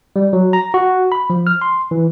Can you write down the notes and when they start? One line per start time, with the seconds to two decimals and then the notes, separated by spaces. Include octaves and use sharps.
0.16 G3
0.33 F#3
0.53 A#5
0.74 F#4
1.12 B5
1.30 F3
1.47 F6
1.61 C6
1.91 E3